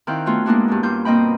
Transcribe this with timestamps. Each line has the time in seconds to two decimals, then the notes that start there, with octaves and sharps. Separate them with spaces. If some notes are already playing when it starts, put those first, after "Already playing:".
0.07 D#3 C4 E4 F5 G5 F#6
0.26 A3 B3 C#4 F4 F#4
0.46 G#3 A#3 B3 D4 E4 F#4
0.68 G2 C#4 D4
0.83 G2 G3 F4 G6
1.05 B2 A#3 C4 D#5 G5 B5